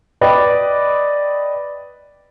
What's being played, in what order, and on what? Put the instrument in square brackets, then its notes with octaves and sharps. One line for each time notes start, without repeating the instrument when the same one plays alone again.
[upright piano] B4 D5 D#5 G5 B5 D6